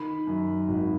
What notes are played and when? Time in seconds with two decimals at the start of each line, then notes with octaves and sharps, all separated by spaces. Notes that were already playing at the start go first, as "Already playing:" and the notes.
Already playing: D#3 B5
0.27 F#2
0.68 G#1